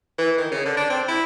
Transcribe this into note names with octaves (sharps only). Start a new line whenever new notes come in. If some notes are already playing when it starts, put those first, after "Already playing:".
E3
D#3
C#3
D3
D4
C4
E4